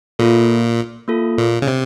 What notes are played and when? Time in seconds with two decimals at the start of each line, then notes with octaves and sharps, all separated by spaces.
0.19 A#2 A#3 F4 A4
1.08 A#3 F4 A4
1.38 A#2
1.62 C#3
1.68 C3